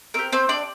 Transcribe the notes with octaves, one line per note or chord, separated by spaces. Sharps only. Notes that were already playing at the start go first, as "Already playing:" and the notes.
C4 G4 A#4
C4 C5
D4 D5